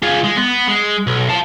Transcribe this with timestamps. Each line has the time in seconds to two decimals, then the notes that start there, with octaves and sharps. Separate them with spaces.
0.02 F4 G#4
0.24 G#3
0.36 B3
0.67 G#3
1.07 B1
1.29 F5 A5